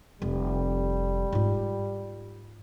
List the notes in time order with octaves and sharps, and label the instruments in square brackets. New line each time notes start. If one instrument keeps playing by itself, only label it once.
[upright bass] F1 [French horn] G3
[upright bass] G#2 F4